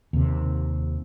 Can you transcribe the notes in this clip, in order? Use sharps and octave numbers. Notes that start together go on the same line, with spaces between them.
D#2 C3